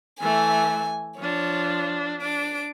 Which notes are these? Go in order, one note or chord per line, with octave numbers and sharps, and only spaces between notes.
E3 A3 G#5
F3 D4 C#5
D4 D7